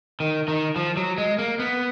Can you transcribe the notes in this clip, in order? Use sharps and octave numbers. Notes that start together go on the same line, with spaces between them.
D#3
D#3
F3
F#3
G#3
A#3
B3